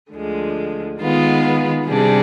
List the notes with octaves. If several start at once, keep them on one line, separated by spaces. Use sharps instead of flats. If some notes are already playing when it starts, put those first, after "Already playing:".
D2 D3 F3 G#3
D#3 G#3 B3 F4
C3 G3 D4 G#4